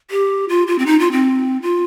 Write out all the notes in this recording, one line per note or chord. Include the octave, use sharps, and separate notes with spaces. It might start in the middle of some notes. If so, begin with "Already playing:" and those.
G4
F4
F4
C4
D#4
F4
C4
F4